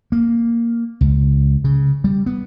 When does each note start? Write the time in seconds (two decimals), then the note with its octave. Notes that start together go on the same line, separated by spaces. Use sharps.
0.12 A#3
1.01 C#2
1.64 C#3
2.04 G3
2.26 B3